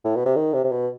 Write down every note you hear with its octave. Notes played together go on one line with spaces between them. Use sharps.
A2
B2
C3
D#3
C3
C3
B2